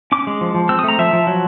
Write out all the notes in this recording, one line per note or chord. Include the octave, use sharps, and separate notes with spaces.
C#4 D6
G#3
F3
F3
C4 E6
D#6
A3 A#5
F3 E5
F3
F#3